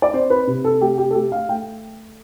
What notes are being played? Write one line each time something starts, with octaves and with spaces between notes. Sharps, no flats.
D5
C4 C5
B4
C3
A4
A3 G4
G4
A4
A3 G4
F5
A3 G5